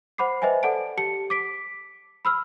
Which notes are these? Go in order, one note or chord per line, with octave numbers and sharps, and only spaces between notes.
C5 F#5 B5 D6 C7
B4 C5 D#5 E5 G5 G#5
A4 D5 F#5 A5 D7
G4 A5 C#7
D6 B6 D7
B5 E6 F6